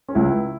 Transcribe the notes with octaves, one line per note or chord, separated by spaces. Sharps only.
C#4
C#2 E4